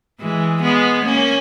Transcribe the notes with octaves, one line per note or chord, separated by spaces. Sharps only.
E3 G#3
G#3 B3
A#3 C#4